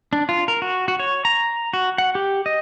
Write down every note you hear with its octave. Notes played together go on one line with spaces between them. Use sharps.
D4
F4
A#4
F#4
F#4
C#5
A#5
F#4
F#5
G4
D#5